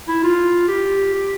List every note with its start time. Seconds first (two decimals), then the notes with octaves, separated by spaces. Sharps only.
0.08 E4
0.23 F4
0.68 G4
1.14 G4